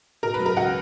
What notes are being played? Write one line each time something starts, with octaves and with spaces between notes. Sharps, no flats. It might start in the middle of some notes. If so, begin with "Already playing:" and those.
B2 A#4 A#5
B4 B5
F#3
A#4 A#5
C#2 F#4 F#5